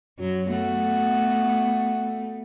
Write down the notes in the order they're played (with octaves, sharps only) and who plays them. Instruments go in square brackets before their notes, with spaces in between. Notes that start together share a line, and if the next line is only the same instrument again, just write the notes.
[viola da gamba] F#2 F#3 F#4
[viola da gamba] A3 B3 [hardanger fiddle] F#4